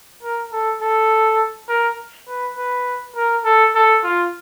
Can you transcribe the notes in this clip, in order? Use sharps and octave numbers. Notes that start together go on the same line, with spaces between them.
A#4
A4
A4
A#4
B4
B4
A#4
A4
A4
F4